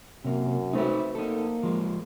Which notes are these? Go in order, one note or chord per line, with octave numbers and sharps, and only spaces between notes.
F#2 C3 A#3
A3 C4 D#4 F#4 B4
A#3 D#4 A4
F3 G#3